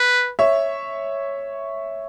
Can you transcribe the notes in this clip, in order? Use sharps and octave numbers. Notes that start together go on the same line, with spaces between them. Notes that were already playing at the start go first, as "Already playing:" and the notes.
Already playing: B4
C#5 E5